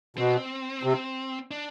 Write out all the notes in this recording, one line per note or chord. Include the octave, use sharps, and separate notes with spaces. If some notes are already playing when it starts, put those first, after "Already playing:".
B2 C4
C3
D4